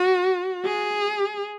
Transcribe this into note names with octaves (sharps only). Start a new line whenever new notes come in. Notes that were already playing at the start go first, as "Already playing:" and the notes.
Already playing: F#4
G#4